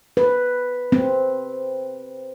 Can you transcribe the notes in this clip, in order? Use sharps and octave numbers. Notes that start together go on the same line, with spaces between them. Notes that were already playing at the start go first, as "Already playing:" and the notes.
B4
C4